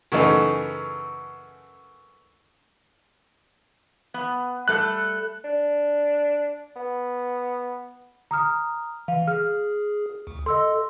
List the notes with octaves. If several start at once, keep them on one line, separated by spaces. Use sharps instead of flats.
F#2 C#3 E3 A3 D#4
B3
G3 A3 A4 F#6
D4
B3
A#5 D#6 F6
E3 F5
G#4 F6
D2
A4 D#5 C6 E6